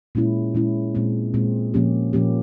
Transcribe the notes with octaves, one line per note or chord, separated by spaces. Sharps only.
A#2 G#3 C#4 E4
A#2 G#3 C#4 E4
A#2 G#3 C4
A#2 G#3 C4
A#2 F3 A#3 C#4 G4
A#2 F3 A#3 C#4 G4